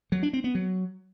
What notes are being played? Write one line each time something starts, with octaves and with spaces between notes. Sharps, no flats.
F#3
D4
C4
B3
F#3